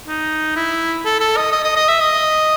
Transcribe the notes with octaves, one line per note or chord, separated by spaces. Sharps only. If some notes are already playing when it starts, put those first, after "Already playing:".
D#4
E4
A4
A4
D#5
D#5
D#5
D#5
E5
D#5